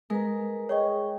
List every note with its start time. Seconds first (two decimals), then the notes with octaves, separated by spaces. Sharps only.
0.10 G#3 A#4 B4 A#5
0.69 G#4 C#5 D#5 G5 C#6